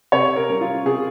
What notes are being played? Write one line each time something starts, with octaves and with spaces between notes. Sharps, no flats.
C3 C#5
A#4
G3 C#4
F4
C3 G#4